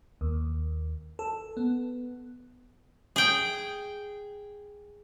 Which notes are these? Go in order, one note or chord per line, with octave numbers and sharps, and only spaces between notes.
D#2
A4
B3
G#4 G5